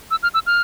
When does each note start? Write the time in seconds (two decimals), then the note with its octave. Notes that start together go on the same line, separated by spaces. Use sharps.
0.11 E6
0.23 F6
0.34 E6
0.46 F6